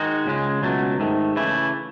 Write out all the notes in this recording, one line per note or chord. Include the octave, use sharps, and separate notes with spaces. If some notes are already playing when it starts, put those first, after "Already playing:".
Already playing: D#3 G#3 D#4 F#4
C#2 C#3 G#3
C#2 B2 F#3 A3
G#2 D#3 A3
C#3 E3 A3 E4